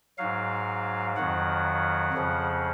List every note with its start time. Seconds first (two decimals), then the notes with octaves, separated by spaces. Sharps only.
0.18 G#2 F#3 F5
1.16 F2 D#3 F#3 F#5
2.14 F2 C#3 F3